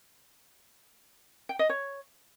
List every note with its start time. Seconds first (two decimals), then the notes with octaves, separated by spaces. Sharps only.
1.49 G5
1.59 D#5
1.69 C#5